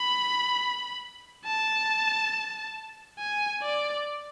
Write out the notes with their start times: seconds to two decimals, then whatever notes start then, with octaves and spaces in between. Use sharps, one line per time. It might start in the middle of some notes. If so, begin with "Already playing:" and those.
Already playing: B5
1.45 A5
3.19 G#5
3.63 D5